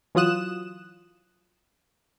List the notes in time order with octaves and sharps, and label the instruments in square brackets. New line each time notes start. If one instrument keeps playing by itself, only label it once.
[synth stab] E3 F#3 F4 D#6 F#6 E7